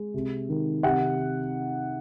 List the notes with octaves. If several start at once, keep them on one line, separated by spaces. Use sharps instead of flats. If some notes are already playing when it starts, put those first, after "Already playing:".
Already playing: G#3
C3
D#3
C3 F#5